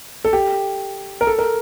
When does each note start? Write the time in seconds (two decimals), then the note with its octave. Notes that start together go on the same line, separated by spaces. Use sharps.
0.25 A4
0.33 G4
1.21 A#4
1.27 A4
1.39 A#4